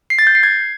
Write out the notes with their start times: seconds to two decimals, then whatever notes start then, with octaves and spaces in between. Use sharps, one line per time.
0.10 C7
0.19 A6
0.27 G6
0.35 C7
0.43 G#6